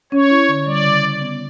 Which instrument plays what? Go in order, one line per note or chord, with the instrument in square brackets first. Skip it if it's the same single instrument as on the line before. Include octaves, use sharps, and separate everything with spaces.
[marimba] C#4 [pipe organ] C#5
[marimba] E4
D3
[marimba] G3 [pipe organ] D5
[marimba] C#3
C#3
B3